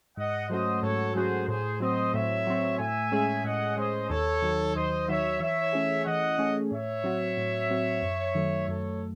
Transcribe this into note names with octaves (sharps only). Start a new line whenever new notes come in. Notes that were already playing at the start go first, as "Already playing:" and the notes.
G#2 D#5 F#5
F#3 A3 C#4 F#4 C5 D#5
G#2 A4 C#5
F#3 A3 C#4 F#4 G#4 C5
A2 G#4 C5
F#3 C4 C5 D#5
A2 C#5 E5
F#3 C4
A2 E5 G#5
G#3 C#4 G#4
A2 D#5 F#5
G#3 C#4 G#4 C5 D#5
D#2 A4 C#5
D#3 F#3
D#2 C5 D#5
D#3 F#3 C#5 E5
E3 C#5 E5
A3 C#4 G#4
E3 D#5 F#5
A3 C#4 G#4
A2 C#5 E5
F#3 C4 F#4
A2
F#3 C4 F#4
F#2
D#3 F#3 A3
F#2 A4 C#5